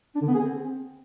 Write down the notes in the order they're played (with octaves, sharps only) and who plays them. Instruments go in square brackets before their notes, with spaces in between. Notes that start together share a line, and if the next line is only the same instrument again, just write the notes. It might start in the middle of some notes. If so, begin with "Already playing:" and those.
[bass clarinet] D4
D3
B3
G#4
C4